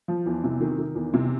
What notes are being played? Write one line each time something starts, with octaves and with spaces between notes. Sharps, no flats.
F3
E2
C3
D#3
D#3
E2
C3